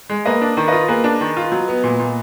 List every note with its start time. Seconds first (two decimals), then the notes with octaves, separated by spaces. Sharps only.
0.10 G#3
0.25 A#3 B4 D#5
0.41 D4
0.57 D#3
0.68 F4 B4 D#5
0.88 A#3 G#4 B4
1.04 D4
1.21 D#3
1.37 F4
1.52 F#3
1.68 B3
1.84 A#2
2.00 A#2